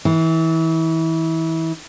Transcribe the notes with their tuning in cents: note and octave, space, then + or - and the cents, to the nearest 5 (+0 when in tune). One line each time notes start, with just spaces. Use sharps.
E3 -25